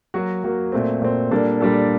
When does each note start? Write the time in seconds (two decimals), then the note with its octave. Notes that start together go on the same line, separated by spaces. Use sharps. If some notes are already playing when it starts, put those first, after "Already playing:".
0.14 F#3 A#3 F#4
0.44 F#3 A#3 F#4
0.72 A#2 A3 C4
1.02 A#2 A3 C4
1.31 A#2 G3 A#3 D4 A4
1.61 A#2 G3 A#3 D4 A4